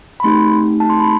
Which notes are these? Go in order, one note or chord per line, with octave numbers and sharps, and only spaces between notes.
B5
A3 C4 D#4 G4 C6
A5
C6
B5